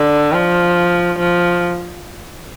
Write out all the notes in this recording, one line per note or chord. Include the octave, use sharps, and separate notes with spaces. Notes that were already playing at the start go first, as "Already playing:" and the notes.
Already playing: D3
F3
F3